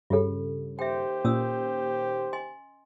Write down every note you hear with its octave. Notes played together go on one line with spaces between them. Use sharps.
G2 C#3 F4 G4 A4
D#2 G4 C5 E5 G5
A#2 C#4 D#6 E6
D#5 G#5 C6